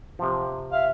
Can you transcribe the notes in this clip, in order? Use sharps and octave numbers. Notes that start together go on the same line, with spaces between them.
C3 F3
E5 F5